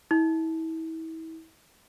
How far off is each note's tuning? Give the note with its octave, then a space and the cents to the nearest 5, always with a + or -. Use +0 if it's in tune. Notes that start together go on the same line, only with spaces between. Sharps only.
E4 -35